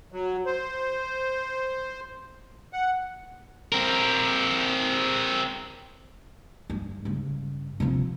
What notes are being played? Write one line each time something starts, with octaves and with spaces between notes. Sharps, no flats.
F#3
C5
F#5
C4 A#4
G2
G2 C#3
C3 F3